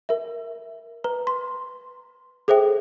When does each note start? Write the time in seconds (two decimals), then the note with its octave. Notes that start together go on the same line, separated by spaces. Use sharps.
0.09 A#4 E5
1.04 B4 A#5
1.27 C6
2.48 G#4 A4 C5 E5 G5